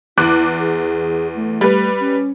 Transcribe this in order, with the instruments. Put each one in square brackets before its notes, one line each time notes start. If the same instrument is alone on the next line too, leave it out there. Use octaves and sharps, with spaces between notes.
[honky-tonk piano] E2 D6 F#6 [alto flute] E4
[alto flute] G#4
A3
[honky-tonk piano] G3 B4
[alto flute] C#4